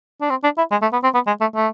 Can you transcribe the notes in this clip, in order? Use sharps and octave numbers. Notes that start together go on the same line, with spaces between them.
D4
C4
D4
E4
G#3
A3
B3
C4
B3
G#3
A3
A3